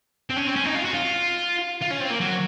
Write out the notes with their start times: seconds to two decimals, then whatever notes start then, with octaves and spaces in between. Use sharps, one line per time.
0.30 C4
0.37 C#4
0.47 C4
0.56 C#4
0.66 D#4
0.75 F4
0.85 F#4
0.94 F4
1.82 F4
1.91 C#4
2.01 C4
2.11 A#3
2.21 F#3